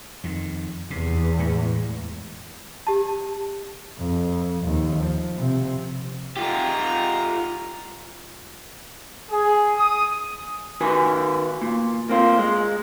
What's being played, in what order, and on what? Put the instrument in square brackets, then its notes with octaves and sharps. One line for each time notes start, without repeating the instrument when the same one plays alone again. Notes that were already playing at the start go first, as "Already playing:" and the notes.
[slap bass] F2 D#3
[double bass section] E2 [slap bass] C3
[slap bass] A2 G#3
[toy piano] G4 A5
[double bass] F2
D#2
F3
C3
[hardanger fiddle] G#3 A#5 [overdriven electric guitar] F4 G4
[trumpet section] G#4
D#6
[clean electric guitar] D#3 F#4 B4 G#5
A#2
A#3 C4 F4
G#3